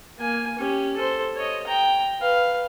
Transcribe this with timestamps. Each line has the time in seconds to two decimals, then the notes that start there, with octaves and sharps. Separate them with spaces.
0.19 A#3 G#5
0.58 C#4 G4
0.96 A4 C5
1.36 C#5 D#5
1.67 G5 A#5
2.20 B4 F5